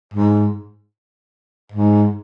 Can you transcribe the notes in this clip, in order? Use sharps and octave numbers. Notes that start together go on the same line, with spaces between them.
G#2
G#2